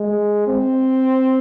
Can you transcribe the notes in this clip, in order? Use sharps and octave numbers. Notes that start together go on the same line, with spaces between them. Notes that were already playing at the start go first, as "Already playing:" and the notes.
Already playing: G#3
C4